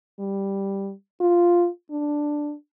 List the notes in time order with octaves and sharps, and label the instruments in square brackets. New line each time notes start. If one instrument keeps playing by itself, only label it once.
[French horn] G3
F4
D4